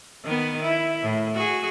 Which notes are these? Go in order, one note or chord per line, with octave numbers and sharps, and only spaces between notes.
D#3 B3
E4
A2
F#4 G#4